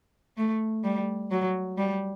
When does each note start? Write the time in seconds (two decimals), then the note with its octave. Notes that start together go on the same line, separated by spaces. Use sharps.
0.37 A3
0.84 G3
1.31 F#3
1.78 G3